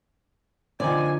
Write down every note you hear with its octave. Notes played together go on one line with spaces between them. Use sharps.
D3 D#3 F3 D5 G#5